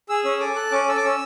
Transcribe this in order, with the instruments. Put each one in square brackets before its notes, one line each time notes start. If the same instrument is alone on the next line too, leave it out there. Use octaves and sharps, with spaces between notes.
[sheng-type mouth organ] G#4 E6
C#4 E6
A4 D6
A4 F#6
C#4 D6
A4 E6
D6
C#4 E6